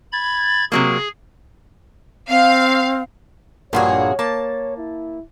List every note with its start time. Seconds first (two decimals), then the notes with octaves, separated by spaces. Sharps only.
0.12 B5 G#6 A6
0.72 C3 F#3 A#3 G#4
2.29 C4 F5
3.73 A#1 G2 A#2 A#3 F#4 G#4 C#5
4.19 A#3 A5
4.78 E4